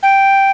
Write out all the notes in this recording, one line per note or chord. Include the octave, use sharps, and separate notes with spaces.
G5